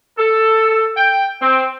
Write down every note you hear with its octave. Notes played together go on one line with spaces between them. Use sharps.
A4
G5
C4